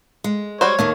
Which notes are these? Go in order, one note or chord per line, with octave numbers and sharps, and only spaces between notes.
G#3
G3 F#4 C5 C#5
D#2 D#3 A3 A#3